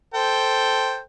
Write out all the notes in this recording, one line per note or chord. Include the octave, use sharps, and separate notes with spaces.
A4 C5 G5